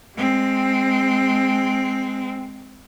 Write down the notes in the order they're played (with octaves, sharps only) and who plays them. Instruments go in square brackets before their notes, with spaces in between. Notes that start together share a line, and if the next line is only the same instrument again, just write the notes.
[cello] G#3 C4